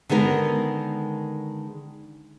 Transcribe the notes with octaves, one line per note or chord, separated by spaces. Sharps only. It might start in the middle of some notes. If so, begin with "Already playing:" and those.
D3 D#3 G#3 B3 A#4